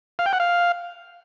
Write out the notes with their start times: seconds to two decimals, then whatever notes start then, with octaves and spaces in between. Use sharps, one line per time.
0.19 F5
0.26 G5
0.33 F#5
0.40 F5